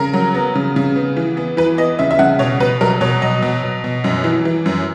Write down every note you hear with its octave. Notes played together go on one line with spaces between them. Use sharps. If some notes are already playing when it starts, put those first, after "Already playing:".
Already playing: C#3 A#4
F#3
B3
C#3
C#3
B3
E3
B3
E3 B4
B3 D#5
C#3 E5
E5
C#3 F#5
B2 C#5
B2 B4
F#3 A#4
B2 C#5
F#3 D#5
B2
B2
B2
F#2
E3
E3
F#2